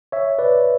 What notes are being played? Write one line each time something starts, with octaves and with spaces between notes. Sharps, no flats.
C#5 E5
B4 D5